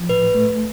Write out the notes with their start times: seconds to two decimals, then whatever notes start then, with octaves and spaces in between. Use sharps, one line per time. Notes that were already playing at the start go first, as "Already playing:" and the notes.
Already playing: F3
0.09 A2 B4
0.35 A3